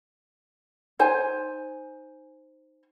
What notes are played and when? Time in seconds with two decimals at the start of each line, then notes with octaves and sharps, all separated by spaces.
0.99 D#4 C5 G#5